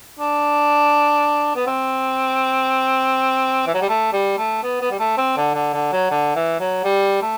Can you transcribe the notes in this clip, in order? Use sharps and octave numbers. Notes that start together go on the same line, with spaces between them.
D4
B3
C4
E3
F#3
G3
A3
G3
A3
B3
B3
G3
A3
C4
D3
D3
D3
F#3
D3
E3
F#3
G3
A3